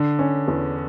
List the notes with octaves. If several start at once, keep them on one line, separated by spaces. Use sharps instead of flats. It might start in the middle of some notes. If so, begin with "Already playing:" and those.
Already playing: D3
C#4
E2